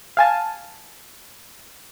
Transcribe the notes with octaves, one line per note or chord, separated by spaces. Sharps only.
F5 G#5 A5